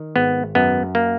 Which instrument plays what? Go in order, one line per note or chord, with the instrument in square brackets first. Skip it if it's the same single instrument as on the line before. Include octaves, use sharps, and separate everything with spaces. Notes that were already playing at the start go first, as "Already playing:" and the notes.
Already playing: [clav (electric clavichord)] D#3
G#1 B3
F#2 B3
A#3